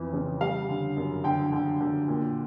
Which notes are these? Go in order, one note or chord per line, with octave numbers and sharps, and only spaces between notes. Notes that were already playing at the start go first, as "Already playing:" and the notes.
Already playing: F2 E3
C#3
G3 F5
D3
F#2
D3 G5
D3
D3
A#2